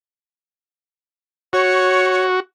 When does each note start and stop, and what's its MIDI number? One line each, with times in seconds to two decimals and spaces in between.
1.53 2.40 66
1.53 2.26 73